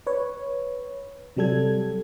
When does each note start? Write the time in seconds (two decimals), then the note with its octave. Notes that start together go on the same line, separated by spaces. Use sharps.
0.07 B4 C#5
1.37 C3 F#3 G3 A4 G#6